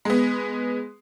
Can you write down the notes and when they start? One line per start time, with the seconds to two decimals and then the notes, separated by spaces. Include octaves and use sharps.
0.05 G#3 B3